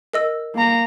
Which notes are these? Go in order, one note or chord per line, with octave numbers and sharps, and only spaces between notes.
A#4 D#5 E6
A#3 A#5